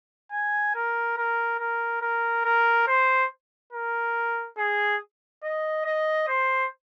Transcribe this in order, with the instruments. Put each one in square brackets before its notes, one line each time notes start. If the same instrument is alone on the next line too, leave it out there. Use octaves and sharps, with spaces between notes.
[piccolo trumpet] G#5
A#4
A#4
A#4
A#4
A#4
C5
A#4
G#4
D#5
D#5
C5